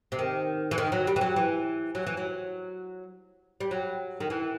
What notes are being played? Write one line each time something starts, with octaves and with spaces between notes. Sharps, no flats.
C3
D#3
E3
D#3
F#3
G3
E3
F#3
E3
F#3
E3
F#3
G3
F#3
D#3
E3